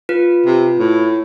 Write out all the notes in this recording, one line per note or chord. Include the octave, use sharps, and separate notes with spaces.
F4 B4
C3
A2